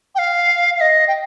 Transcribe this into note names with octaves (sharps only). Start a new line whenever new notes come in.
G5
F5
F5
D#5
G5